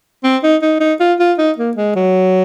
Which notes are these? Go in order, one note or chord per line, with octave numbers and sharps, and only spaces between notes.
C4
D#4
D#4
D#4
F4
F4
D#4
A#3
G#3
F#3